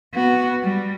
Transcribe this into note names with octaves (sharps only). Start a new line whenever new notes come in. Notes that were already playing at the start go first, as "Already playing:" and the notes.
B3 F#4
G3